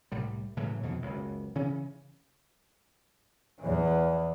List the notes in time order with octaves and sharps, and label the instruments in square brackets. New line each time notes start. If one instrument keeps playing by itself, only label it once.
[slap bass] C2 A2 G3
A2 C#3 E3 F#3
F2 B2 D#3 E3
F#1 C#2
C#3 E3 C#4
[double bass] E2 E3